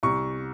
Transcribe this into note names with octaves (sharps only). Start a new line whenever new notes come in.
C2 C#6